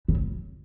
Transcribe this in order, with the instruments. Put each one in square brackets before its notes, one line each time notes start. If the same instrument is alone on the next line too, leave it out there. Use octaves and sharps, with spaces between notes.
[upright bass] C#3